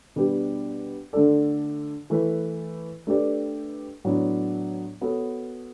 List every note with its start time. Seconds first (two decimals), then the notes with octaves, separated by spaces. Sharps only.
0.16 B2 G3 D4 G4 B4
1.13 D3 A3 D4 A4 D5
2.10 E3 A3 E4 B4
3.07 A3 D4 G4 B4 D5
4.04 A2 F#3 B3 D4
5.01 B3 F#4 A4 C#5